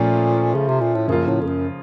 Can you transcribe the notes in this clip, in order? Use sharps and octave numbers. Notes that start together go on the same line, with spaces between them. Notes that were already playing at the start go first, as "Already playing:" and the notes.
Already playing: A#2 F3 A3 C#4 F4
C#3
C3
A#2
A2
F#2 C#3 F3 A#3 F4
A2
F2
F#2